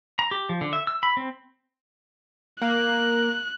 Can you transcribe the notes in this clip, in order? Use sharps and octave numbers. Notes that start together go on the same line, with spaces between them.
A#5
G4
F3
D3
E5
E6
B5
C4
A#3 F#6